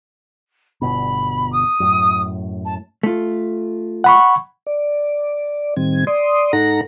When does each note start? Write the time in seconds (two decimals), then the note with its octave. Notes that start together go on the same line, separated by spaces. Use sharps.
0.82 G1 B2 B5
1.52 D#6
1.80 F#2 A2
2.65 A5
3.03 A3 F4
4.04 F#5 B5 C#6
4.66 D5
5.76 A2 D#3 G3 C4 G#6
6.07 D5 C6 D#6
6.53 G#2 D#4 A4 F#5 A#5 A#6